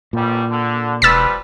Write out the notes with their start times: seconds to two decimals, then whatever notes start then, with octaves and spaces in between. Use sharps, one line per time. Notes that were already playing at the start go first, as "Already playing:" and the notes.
0.13 A1 A#2 G3
0.50 D3
1.02 E1 F3 G3 B4 E6 A6 B6